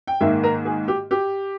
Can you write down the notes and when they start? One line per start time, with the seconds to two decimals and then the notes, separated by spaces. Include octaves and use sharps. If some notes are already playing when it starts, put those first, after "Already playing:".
0.07 G5
0.20 G#2 D#3 A#3 E5
0.43 A#4
0.65 G#4
0.88 G4
1.11 G4